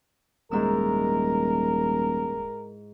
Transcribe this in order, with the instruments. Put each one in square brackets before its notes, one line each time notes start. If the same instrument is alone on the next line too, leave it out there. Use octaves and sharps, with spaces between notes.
[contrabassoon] D#1 [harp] G#2 E4 E6 [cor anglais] A#4